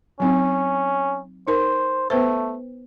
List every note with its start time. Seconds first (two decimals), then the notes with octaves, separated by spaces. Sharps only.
0.20 F#3 C4 C#4 D#4
1.48 D#4 A#4 C5
2.10 A3 B3 B4 C5